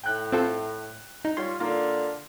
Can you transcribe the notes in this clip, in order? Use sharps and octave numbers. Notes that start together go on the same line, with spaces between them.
A2 G5 F#6
C4 F4 A4
D#4
G3 F4 C#5 C6
D3 A#3 F4